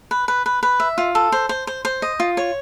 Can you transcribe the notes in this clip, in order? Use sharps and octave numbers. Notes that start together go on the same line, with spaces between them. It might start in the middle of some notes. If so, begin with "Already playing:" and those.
B4
B4
B4
B4
E5
F4
A4
C5
C5
C5
C5
D#5
F4
C#5